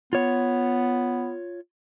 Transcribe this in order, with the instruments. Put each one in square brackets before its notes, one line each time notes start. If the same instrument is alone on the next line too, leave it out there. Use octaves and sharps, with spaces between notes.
[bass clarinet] B3 [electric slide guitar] F4 C#5